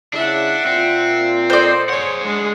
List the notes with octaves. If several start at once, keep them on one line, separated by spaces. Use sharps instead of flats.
C#3 D4 E4 E5 F#5
A#2 C4 F4
A4 C5 D5 D#5
G#4 C#5 F#5
G#3 D4